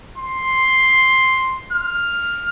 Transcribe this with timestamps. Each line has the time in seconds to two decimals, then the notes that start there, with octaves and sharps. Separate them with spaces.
0.18 C6
1.73 F6